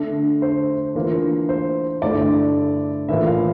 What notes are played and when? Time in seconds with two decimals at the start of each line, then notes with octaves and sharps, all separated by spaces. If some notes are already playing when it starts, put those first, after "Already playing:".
Already playing: D3 A3 D4
0.42 C5
0.95 E3 A#3 D4 F4
1.49 C5
2.02 G2 D3 A3 E4 D5
3.09 A2 E3 A#3 F4 E5
3.27 F5